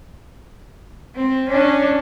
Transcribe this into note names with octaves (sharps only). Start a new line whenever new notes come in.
C4
C#4 D4